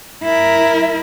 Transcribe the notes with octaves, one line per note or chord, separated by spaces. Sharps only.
E4 A#4